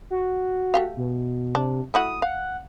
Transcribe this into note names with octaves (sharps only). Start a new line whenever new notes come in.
F#4
A3 G4 F5
B2
C3 D4
A3 E4 F#4 D#6
F5 F#5